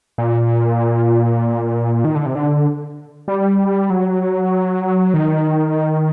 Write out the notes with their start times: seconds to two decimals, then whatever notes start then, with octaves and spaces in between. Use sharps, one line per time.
0.18 A#2
2.04 D#3
2.15 D3
2.26 C3
2.35 D3
3.28 G3
3.90 F#3
5.14 D#3